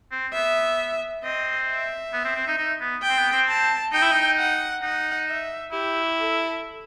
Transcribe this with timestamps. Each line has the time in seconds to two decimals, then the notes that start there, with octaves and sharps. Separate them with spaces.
0.11 C4
0.33 B3 E5
1.24 C4 D#5
1.69 E5
2.13 B3
2.25 C4
2.36 C4
2.47 D#4
2.58 D#4
2.81 B3
3.03 G5
3.09 C4
3.18 B3
3.33 C4
3.48 A5
3.93 D#4 G5
4.02 E4
4.12 D#4
4.38 F#5
4.82 D#4 F#5
5.28 E5
5.72 E4 G4
6.18 A4